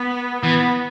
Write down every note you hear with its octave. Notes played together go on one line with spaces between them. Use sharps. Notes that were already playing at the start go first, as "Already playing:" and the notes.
Already playing: B3
E3 B3